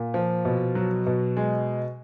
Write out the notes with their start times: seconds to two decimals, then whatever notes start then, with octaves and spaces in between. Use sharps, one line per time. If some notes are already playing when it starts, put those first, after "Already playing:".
Already playing: A#2
0.14 F3
0.45 B2
0.75 F#3
1.06 B2
1.37 G#3